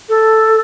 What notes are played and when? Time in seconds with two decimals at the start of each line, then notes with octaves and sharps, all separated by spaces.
0.09 A4